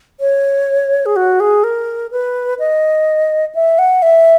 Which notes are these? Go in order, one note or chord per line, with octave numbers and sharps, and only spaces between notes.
C#5
G#4
F#4
G#4
A#4
B4
D#5
E5
F#5
E5